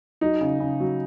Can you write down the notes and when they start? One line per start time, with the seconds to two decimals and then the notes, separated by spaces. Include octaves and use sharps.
0.21 F#3 D#4
0.41 C#3
0.60 C#3
0.80 F#3